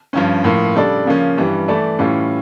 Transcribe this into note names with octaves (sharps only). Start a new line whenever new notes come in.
G2 F3 C#4
A2 F3 A#3
C#3 G3 D4 A4 D5
C#3 F3 A#3 C#4
G2 E3 G3
E3 A3 E4 A4 D5
A2 E3 G3 C#4 F4